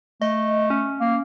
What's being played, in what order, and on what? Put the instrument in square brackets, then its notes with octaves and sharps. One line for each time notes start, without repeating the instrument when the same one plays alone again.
[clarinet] A3 [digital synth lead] D#5
[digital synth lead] C#4
[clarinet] A#3